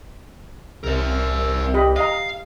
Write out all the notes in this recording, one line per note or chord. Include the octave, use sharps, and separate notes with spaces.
C2 A#4 E5
G4 D#5 B5
D#5 F5 A#5